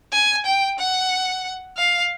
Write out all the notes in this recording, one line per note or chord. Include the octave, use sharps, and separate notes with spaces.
G#5
G5
F#5
F5